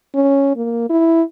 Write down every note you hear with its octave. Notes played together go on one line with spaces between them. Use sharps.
C#4
A#3
E4